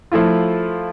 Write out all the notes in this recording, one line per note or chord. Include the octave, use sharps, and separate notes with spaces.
F3 A3 E4 F4